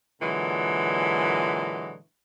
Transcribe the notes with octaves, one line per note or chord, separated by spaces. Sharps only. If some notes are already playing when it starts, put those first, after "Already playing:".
A#2 D3 E3 F#3 G#3